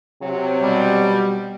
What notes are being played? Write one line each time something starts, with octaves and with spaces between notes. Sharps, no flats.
C3 F#3
B2 G3